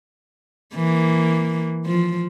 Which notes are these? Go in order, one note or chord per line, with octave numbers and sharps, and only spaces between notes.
E3 A#3
F3